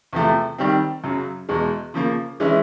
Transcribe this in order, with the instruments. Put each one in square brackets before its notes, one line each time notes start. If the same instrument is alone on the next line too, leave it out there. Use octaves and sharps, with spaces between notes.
[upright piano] E2 C3 F3 A3
D#3 G3 C4
F#2 C#3 F#3
E2 B2 G#3
C#3 F3 A#3
E3 G#3 C#4 E4